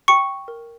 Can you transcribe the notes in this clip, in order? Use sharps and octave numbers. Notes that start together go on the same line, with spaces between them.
G5 C#6 C#7
A#4